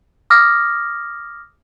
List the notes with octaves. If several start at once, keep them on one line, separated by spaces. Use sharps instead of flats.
D6 D#6 F6 A#6